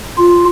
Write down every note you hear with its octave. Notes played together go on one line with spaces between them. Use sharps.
F4